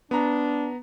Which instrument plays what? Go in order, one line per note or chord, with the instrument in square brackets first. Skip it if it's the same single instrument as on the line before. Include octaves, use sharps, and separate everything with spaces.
[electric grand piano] B3 A#5 [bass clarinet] D4